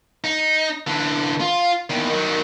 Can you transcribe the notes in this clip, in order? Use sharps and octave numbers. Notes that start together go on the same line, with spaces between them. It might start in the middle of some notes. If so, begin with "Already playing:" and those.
D#4
D3 E3
F4
E2 D#3
D#3 F#3